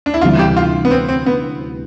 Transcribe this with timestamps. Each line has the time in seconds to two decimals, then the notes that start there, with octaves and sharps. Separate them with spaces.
0.06 D4
0.14 E4
0.21 D2 C3 E3 G3 F4
0.39 G4
0.57 F4
0.85 B3
0.91 C4
1.09 C4
1.26 B3